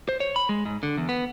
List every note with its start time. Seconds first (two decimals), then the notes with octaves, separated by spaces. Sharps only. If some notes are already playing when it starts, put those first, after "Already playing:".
0.09 C5
0.20 C#5
0.36 B5
0.49 G#3
0.65 G#2
0.83 D3
0.97 E2
1.09 B3